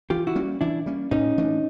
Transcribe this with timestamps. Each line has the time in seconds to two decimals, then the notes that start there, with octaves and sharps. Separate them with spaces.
0.10 E3 F4 G4
0.27 E4 F#4
0.35 G3 A#3 C#4
0.61 E3 D4 E4
0.86 G3 A#3 C#4
1.11 A2 C#4 D#4
1.38 E3 A3 D4